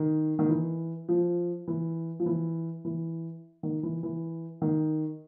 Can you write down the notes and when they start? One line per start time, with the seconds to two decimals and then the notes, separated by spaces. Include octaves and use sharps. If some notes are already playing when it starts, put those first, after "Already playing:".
Already playing: D#3
0.39 D#3
0.49 E3
1.09 F3
1.68 E3
2.20 F3
2.26 E3
2.85 E3
3.63 D#3
3.83 E3
4.03 E3
4.62 D#3